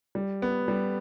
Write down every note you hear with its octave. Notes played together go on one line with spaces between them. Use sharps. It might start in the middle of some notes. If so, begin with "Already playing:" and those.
G3
B3
G3